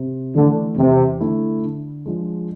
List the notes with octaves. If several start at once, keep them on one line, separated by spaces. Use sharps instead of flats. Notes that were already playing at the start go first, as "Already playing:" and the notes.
Already playing: C3
D3 E3 A3
E2 C3
D3 A3 E4
D3
F3 G#3 D4